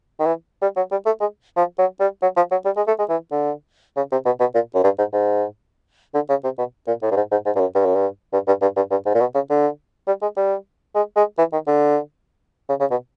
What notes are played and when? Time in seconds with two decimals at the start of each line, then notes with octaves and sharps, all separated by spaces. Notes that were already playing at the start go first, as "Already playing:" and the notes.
0.20 D#3
0.26 E3
0.62 G3
0.77 F#3
0.91 G3
1.06 A3
1.20 G#3
1.56 F3
1.78 F#3
2.00 G3
2.22 F#3
2.36 F3
2.51 F#3
2.65 G3
2.77 G#3
2.87 A3
2.99 G#3
3.09 E3
3.31 D3
3.96 C#3
4.11 C3
4.25 B2
4.40 B2
4.54 A#2
4.74 F#2
4.84 G2
4.98 G#2
5.13 G#2
6.14 D3
6.29 C#3
6.44 C3
6.58 B2
6.87 A#2
7.02 A2
7.11 G2
7.16 G#2
7.31 G#2
7.46 G#2
7.56 G2
7.60 F#2
7.74 G2
7.85 F#2
7.95 G2
8.33 G2
8.47 G2
8.62 G2
8.76 G2
8.91 G2
9.06 G#2
9.14 A#2
9.20 B2
9.35 C#3
9.50 D3
10.07 G3
10.22 G#3
10.36 G3
10.95 G#3
11.16 G#3
11.38 E3
11.52 D#3
11.67 D3
12.69 C#3
12.80 C#3
12.91 B2